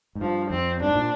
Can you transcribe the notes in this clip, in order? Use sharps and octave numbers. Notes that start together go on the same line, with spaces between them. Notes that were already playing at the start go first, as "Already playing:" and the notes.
G#2
G2 F3
F2 C4
G2 D4
G#2
A#2